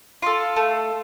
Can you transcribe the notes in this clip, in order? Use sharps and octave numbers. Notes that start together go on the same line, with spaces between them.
F4 A4
A3